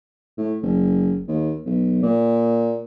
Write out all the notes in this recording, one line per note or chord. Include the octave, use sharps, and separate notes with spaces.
A2
F#1
D#2
B1
A#2